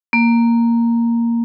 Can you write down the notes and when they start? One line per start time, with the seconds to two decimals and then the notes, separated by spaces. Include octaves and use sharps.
0.13 A#3